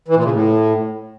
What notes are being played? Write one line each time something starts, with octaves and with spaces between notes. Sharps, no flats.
E3
A#2
C#3
A2